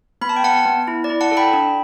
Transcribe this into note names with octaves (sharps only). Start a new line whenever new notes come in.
B3 B5
A5
G5
B3 F#5 A5
B3
E4
D5
E4
F#5 A5
A4
G5 B5
D4